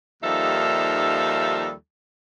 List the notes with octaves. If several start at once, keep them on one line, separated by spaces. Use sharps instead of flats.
D#2 F3 G3 D#4 A4 E5